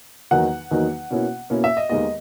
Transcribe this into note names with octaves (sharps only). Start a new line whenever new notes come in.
E2 D#3 F#3 A#3 D#4 F#5
E2 D#3 F#3 A#3 D#4
B2 A#3 C#4 E4
B2 A#3 C#4 E4
E5
D#5
D#2 D#3 G#3 B3 D#5